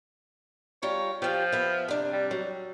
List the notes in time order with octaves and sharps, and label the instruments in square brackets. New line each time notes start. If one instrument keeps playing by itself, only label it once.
[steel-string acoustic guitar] G3 F4 A#5 [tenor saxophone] C#5
[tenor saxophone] F3 [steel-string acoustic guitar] F4 G4
[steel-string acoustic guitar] B3 E5
C3 D4
[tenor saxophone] G3
[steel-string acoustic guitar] F#3